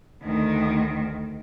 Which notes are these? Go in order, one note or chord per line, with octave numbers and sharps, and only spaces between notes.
D2 D#3